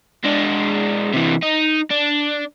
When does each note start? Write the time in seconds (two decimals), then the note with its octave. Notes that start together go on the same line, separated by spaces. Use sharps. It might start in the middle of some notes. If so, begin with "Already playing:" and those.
0.24 G#3 D4
1.14 C3 E3
1.42 D#4
1.90 D4